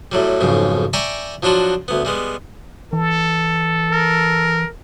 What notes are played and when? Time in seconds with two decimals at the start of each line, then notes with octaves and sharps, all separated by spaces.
0.12 A2 F#3 G3
0.41 B1 F2 G#2 C#3
0.93 D5 E5 G5 G#5 A#5 C#6
1.43 F3 F#3 D4 F4 F#4
1.88 D2 B3
2.05 G3 G#3 B3
2.93 E3 A4
3.92 A#4